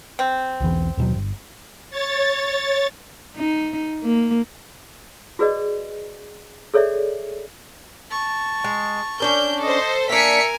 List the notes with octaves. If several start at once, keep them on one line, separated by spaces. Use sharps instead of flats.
C4
B1 E2 E3
D#2 B2 F#3
G1
C#5 A6
D#4
A#3
F#4 G#4 B4 D5 D#5
G#4 A4 C#5 D5 E5
A5 C#6
G#3
C#4 D4 A#4 G6
A4 C5 D#5
A#3 D4 A#4 E5 G#5 B6 C#7